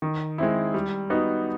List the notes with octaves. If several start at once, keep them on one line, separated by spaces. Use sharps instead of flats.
D#3
G#3 C4 E4
G3
B3 D#4 F#4